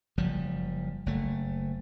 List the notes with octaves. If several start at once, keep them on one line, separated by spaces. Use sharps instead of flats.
F#1 F3 G3
F#1 A3